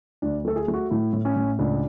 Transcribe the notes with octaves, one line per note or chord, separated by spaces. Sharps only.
D2 D4
A3 A4
G#4
A3
F#4
A2 E4
A2
C#4
A2
C#2 D4